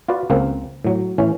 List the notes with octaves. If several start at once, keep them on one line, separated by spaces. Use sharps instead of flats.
F4 F#4 B4 D5
C#2 A#3 C4 A#4
A2 F#3
A2 E3 C#4